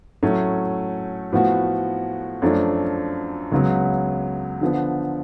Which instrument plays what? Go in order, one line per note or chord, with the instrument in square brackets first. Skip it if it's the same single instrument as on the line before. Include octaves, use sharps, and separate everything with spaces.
[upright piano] A2 F#3 A3 C#4
A2 F3 B3 F#4
F#2 F3 A3 D4
C#2 C#3 F#3 B3
D3 F3 B3